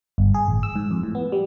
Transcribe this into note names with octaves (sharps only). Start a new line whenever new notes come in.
G1
G#4
A1
E6
G#2
F2
A2
B3
G3